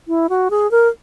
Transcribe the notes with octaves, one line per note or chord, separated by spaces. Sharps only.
E4
F#4
G#4
A#4